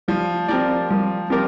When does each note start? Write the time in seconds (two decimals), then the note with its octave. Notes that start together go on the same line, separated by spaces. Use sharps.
0.08 F3 G3
0.48 F3 C4 G4 A#4 D5
0.90 F3 G3
1.30 F3 C4 G4 A#4 D5